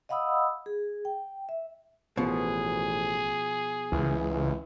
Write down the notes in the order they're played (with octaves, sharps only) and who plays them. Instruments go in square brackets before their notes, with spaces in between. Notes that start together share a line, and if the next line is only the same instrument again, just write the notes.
[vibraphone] D#5 F5 F#5 B5 D#6 E6
G#4
G5
E5
[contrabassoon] A1 [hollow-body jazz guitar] B2 F3 [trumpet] G#4
[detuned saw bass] C#2 [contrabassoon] E3